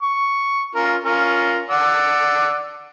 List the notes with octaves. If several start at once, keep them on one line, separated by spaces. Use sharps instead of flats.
C#6
C#4 F4 A#4
C#4 F4 A#4
D5 F#5 E6